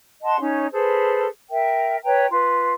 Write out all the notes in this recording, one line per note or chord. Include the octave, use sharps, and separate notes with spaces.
D#5 F#5 A5 C6
C#4 D#4 C#5
G#4 A4 B4 C5
A#4 E5 G5
B4 C#5 G5 A#5
F4 B4